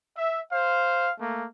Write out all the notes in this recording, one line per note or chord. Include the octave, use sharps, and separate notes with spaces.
E5
C5 F5
A3 A#3